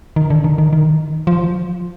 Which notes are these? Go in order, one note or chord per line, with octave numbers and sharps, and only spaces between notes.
D#3
D3
D#3
D#3
D#3
F3